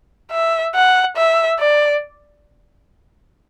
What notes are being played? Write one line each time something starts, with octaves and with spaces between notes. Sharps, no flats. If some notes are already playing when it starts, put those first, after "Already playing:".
E5
F#5
E5
D5